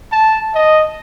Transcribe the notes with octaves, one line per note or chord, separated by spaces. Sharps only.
A5
D#5